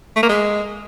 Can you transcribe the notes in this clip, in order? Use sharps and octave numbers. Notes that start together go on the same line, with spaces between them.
A3
A#3
G#3